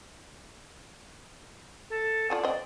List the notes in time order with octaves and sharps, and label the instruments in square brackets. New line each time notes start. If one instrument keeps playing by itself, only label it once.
[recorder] A4
[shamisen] F4 A4 G#5 [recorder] D5
[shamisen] C4 D#5